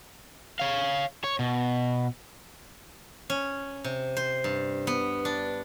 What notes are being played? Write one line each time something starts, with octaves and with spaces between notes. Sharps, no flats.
C#5 F5
C#5
B2
C#4
C3
C5
G2
B3
D4